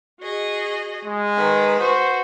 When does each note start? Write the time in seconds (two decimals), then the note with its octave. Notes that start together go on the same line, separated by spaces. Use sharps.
0.20 F#4 G#4 D#5
1.05 G#3
1.37 D#3 B4
1.80 F#4 C5